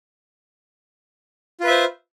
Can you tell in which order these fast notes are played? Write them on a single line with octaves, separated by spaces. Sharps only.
F4 B4 E5 C5